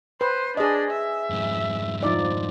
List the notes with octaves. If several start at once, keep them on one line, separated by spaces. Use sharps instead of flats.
B4 C5
D4 G#4 D#5
E5
F2 G#2
F3 D#4 D5